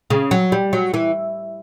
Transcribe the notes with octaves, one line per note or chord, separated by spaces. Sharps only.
C#3
F#3
G3
F#3
E3